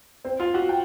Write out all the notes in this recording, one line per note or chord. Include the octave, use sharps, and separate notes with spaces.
C4 C5
F4 F5
F#4 F#5
G5